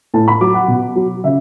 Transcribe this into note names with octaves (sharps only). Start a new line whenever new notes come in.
A2 A5
B5
F#3 D6
F#5
B2
F#3
C#3 E5